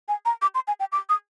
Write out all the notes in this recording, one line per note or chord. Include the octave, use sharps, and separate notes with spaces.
G#5
A#5
D6
C6
G#5
G5
D6
D#6